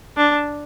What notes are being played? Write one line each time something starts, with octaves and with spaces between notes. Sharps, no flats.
D4